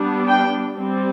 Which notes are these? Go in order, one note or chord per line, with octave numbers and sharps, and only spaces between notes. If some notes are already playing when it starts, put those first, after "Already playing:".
Already playing: G3 B3 D4
G5
G3 C4